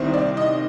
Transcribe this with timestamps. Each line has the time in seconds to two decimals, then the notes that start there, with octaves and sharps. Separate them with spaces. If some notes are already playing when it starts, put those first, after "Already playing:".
Already playing: C2 C3 D#3 C5
0.14 D5
0.37 D#5